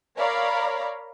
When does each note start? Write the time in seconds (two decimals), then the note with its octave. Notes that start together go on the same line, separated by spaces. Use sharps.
0.18 A#4 C#5 D5 F5 A#5 B5